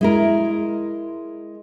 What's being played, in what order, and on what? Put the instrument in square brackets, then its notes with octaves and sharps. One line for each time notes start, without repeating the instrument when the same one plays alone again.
[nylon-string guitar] G#3 E4 A#4